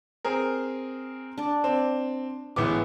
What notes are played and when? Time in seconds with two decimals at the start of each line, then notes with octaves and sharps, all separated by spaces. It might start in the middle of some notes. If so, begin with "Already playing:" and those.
0.25 C4 G#4 A#4
1.38 D4 D5
1.64 C4
2.56 A1 G#3 B3 E4 D6